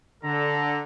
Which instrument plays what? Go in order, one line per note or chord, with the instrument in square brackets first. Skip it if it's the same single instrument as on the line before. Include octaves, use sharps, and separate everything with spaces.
[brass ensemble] D3 A4 [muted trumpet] A#5